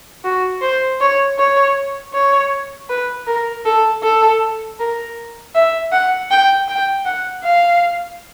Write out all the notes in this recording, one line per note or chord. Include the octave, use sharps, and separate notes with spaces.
F#4
C5
C#5
C#5
C#5
B4
A#4
A4
A4
A#4
E5
F#5
G5
G5
F#5
F5